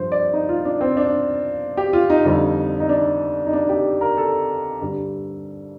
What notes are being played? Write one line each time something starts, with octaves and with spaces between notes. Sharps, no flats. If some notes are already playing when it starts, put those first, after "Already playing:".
Already playing: G2 F3 C5
D5
D#4
F4
D4
C4
D4
G4
F4
D#4
F2 D3 G3
D#4
D4
D#4
D4
G4
A#4
A4
G2 D3 G3